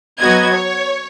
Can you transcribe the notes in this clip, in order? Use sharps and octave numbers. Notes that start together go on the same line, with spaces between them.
F#3 B3 F#4 D#5 G#6
C#5